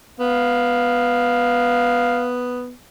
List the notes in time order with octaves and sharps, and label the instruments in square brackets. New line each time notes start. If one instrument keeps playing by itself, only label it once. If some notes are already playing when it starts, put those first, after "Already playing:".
[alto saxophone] B3 [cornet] F5